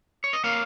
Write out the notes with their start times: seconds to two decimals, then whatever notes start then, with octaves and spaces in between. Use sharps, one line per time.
0.24 C#5
0.33 D#5
0.44 A#3 C#5 F5